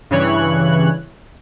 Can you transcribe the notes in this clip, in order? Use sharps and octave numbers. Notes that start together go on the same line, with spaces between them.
G2 C#3 E3 C#5 F#6